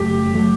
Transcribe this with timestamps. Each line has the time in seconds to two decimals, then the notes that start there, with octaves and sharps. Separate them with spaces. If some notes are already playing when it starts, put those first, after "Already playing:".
Already playing: F#1 F#2 F#3 A3 G4
0.34 F#3 A3